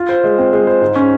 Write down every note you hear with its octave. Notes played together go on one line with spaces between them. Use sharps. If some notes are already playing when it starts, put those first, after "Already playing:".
Already playing: F4
C5
G#3
C4
G#3
C5
G#2
C#4